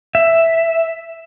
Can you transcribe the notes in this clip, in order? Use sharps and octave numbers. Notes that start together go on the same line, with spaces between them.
E5